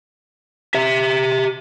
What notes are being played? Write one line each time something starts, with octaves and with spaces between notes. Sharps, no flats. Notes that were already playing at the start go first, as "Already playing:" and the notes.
G4 E5